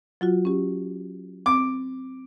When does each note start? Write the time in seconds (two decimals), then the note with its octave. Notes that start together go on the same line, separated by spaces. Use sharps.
0.21 F#3 F4 F#4
0.45 C#4 G4
1.46 C4 D6